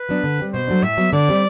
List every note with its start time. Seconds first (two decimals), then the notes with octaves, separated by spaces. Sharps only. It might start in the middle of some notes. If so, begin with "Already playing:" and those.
Already playing: B4
0.09 F#3 B3 D4
0.24 D3
0.38 G3 C4
0.53 B2 C5
0.68 F#3 A3 D4
0.82 A2 E5
0.97 F#3 B3
1.13 D3 D5
1.28 G3 C4